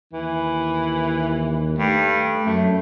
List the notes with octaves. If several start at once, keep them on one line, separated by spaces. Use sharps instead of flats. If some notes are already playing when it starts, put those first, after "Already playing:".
D#2 E3
G2 A3
F#2 A3